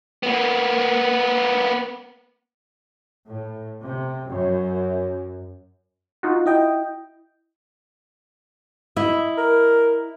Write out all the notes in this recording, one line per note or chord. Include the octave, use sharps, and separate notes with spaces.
A#3 B3
A2
C3
F#2
D#4 F4 F#4
E4 D#5 G5
E4 D#5 E5
A#4